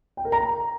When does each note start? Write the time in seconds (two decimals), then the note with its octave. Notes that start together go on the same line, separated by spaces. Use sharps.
0.17 G5
0.25 A#4
0.32 A#5